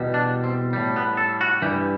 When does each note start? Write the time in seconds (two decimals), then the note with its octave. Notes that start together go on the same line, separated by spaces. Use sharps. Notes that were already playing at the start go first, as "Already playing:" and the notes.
Already playing: E2 B2 G3
0.14 D4
0.44 C4
0.73 A2 G3
0.96 B3
1.17 A4
1.41 F#4
1.62 G2 E3 G3 G4